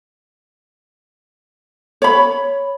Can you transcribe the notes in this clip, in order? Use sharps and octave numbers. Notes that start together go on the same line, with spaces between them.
C#5 B5